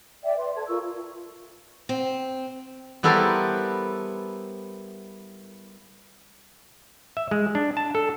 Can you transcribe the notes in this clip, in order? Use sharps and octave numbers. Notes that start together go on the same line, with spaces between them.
D5 E5 G5
B4 D5 C6
A4 B4 A5 G#6
F4 A#4 C#6 E6
C4
G3 B3 E4 A4 A#4 C5
E5
G#3
D4
A5
A4